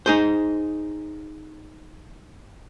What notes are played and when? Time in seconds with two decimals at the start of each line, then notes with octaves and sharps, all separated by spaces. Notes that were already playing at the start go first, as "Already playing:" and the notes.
0.06 D#4 G#4 C5